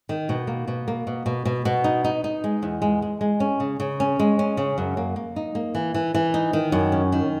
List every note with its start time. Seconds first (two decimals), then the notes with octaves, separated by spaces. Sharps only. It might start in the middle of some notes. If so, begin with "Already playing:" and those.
0.09 D#3
0.29 B2
0.47 A#3
0.68 B2
0.88 A#3
1.07 B2
1.26 B2
1.45 B2
1.65 B2
1.84 D#4
2.04 D#4
2.24 D#4
2.44 G#3
2.63 E2
2.82 G#3
3.02 G#3
3.21 G#3
3.40 C#4
3.60 C#3
3.80 C#3
4.00 C#4
4.19 G#3
4.39 C#4
4.57 C#3
4.78 F#2
4.97 A#3
5.16 A#3
5.36 D#4
5.55 A#3
5.75 E3
5.94 E3
6.14 E3
6.34 D#4
6.53 D#3
6.72 F#2
6.92 C#4
7.12 D#3